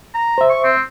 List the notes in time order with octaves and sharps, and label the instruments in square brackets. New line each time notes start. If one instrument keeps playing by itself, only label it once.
[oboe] A#5
[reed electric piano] C5 E5
[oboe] C#6
C4